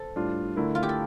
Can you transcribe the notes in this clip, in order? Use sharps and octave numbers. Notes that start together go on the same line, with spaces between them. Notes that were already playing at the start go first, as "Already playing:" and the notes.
Already playing: A4 C5
A2 G3 D4 F4
D3 A3 E4 A#4
F4
G4
A4